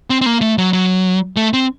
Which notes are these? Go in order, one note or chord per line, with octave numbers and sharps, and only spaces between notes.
C4
C4
A#3
A3
F#3
F#3
A3
C4